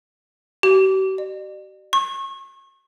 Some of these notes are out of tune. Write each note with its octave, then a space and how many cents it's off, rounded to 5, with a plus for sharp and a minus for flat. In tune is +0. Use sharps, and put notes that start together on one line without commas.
G4 -45
D5 +45
C#6 -35